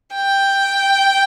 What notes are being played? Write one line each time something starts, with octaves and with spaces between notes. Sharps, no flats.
G5